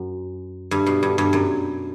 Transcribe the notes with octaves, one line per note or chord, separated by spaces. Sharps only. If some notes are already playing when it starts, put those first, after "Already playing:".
Already playing: F#2
G2
B2
G2
G2
F#2